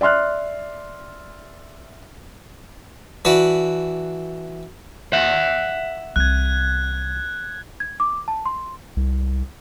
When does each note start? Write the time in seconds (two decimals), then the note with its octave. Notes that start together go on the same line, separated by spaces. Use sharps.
0.01 D5 E5 C6 F6 F#6
3.25 E3 F#4 D5 A5 B5
5.13 E5 F#5
6.16 C2 E3 F#6 G#6
7.80 G#6
8.00 D6
8.28 A5
8.46 C6
8.96 C2